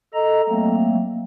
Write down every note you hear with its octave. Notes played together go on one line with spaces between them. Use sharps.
A4 D#5 A#5
F#3 A3 A#3 C4